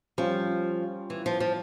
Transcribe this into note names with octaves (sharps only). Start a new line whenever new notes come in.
F3 G3 C#4 F4
E3
F3
F3